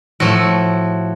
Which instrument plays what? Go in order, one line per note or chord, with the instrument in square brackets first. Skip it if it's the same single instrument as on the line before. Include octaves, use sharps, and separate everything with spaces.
[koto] A2 F3 A3 F#4